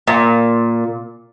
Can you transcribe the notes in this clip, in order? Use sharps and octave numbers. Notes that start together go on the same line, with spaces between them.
A#2